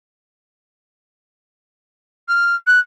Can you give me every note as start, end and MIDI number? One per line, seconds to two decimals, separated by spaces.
2.28 2.55 89
2.67 2.79 90